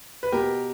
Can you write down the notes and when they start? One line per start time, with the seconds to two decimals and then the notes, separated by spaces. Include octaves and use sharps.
0.23 B4
0.32 B2 G4 A#4